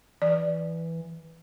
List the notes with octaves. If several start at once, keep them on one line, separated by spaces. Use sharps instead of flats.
E3 D5